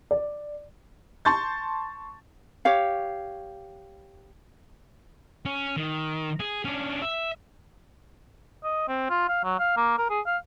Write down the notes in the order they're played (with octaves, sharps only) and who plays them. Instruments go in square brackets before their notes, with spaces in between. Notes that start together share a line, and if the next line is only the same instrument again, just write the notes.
[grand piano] D5
[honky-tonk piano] A5 C6 C#6 G6 A6
[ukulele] G4 C#5 F5
[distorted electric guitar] C#4
D#3
G#4
C#4 D4
E5
[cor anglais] D#5
C4
F4
F5
F#3
F5
A#3
A#4
G#4
F5